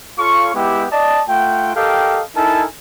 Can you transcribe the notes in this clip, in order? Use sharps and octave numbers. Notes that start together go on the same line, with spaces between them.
F4 A4 C#5 F5 C#6
G#3 B3 E4 G4
D5 D#5 A5
A3 F4 F#5 G5
G4 A4 A#4 D#5 F5 G5
D#4 E4 A4 A#4 G#5 A5